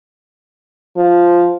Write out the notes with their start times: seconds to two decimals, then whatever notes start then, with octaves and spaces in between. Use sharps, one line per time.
0.97 F3